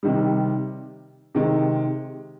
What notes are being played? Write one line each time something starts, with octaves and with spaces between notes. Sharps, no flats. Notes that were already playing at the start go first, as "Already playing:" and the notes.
C3 D#3 G3
C3 D#3 G#3